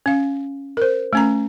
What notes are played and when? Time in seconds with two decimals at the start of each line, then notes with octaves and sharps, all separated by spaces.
0.06 C#4 F5
0.77 A#4 C5
1.13 A3 C#4 A#5